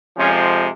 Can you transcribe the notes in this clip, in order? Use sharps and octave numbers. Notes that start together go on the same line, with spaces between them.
F2 C3 F3 G#3 C#4